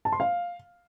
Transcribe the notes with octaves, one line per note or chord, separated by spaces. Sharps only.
A5
C6
F5